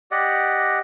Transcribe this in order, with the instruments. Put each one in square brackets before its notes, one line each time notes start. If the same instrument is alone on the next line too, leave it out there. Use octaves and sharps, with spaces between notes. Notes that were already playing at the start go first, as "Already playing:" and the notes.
[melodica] G4 D5 D#5 F#5